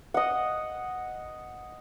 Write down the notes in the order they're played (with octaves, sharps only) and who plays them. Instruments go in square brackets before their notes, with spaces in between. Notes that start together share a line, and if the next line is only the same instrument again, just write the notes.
[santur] D#5 F#5